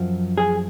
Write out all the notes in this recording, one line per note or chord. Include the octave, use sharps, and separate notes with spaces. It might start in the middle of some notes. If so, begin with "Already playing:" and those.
Already playing: F#2 F3
G#4